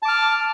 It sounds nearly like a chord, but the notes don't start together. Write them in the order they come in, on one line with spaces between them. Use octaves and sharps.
A5 D6 F6